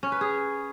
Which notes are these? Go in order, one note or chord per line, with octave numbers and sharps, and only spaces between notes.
C#4
B4
G#4